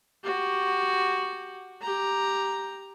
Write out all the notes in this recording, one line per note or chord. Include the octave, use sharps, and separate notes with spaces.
F#4 G4
G4 A#5